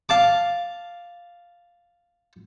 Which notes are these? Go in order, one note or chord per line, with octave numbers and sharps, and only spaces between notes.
F5 A5 D6